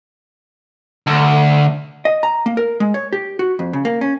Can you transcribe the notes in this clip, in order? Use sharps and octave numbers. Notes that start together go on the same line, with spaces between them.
D2
D#5
A#5
A#3
A#4
G#3
C#5
G4
F#4
F2
C#3
A#3
C#4